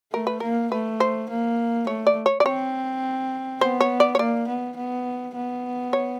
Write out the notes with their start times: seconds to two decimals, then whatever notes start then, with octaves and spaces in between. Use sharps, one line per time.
0.13 A3 A#4
0.27 B4
0.40 A#3 A#4
0.72 A3 B4
1.00 C5
1.29 A#3
1.87 A3 C#5
2.07 D5
2.26 C#5
2.40 D5
2.45 C4 C#5
3.61 B3 C5
3.81 C#5
4.00 D5
4.15 C#5
4.19 A#3 D5
4.48 B3
4.77 B3
5.35 B3
5.93 C#5